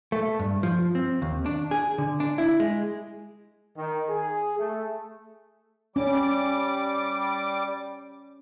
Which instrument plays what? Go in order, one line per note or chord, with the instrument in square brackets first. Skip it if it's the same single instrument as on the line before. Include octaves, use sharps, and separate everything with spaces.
[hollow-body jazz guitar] A3
G2
F3
C4
D#2
D4
G#4
D3
D4
E4
G#3
[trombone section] D#3
G#4
A3
[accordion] G3 D6 [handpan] C#4